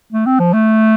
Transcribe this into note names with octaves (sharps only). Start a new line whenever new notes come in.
A3
C4
F3
A3